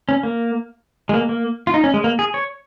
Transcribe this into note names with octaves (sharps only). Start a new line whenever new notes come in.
C#4
A#3
G#3
A#3
A#3
F4
D#4
C#4
G#3
A#3
G#4
C#5